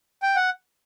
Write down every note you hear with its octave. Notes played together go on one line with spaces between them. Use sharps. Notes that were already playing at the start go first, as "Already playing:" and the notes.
G5
F#5